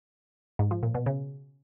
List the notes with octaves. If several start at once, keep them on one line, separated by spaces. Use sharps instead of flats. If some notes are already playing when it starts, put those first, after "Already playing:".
G#2
F3
A#2
B2
C#3